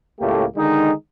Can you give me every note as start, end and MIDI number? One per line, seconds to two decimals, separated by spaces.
0.19 0.43 37
0.19 0.43 45
0.19 0.43 57
0.19 0.43 58
0.19 0.43 67
0.56 0.91 50
0.56 0.91 51
0.56 0.91 56
0.56 0.91 63